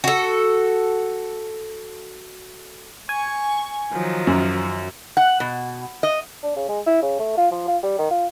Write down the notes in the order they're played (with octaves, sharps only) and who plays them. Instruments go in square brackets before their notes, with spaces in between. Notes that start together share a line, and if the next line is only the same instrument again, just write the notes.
[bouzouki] F#4 A4
[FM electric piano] G#5 [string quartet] C#6
[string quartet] D#3 F3 F#3
[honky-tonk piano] F#2
[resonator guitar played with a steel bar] F#5
B2
D#5
[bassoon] D4
C#3
G#3
E4
C#3
A3
F4
F3
F4
G3
D#3
F4